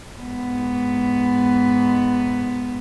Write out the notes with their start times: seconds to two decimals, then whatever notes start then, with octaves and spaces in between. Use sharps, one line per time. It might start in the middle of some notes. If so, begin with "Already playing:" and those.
0.20 G#2 B3